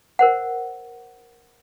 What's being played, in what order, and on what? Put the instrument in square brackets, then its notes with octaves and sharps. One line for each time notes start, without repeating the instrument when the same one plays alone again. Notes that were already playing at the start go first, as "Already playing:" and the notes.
[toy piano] A#4 C5 F#5